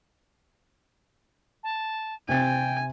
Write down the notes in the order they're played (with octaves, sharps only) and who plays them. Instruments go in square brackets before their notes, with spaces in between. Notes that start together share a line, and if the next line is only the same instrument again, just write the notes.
[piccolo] A5
[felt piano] C3 C4 A6 [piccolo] G5 [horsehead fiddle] G#5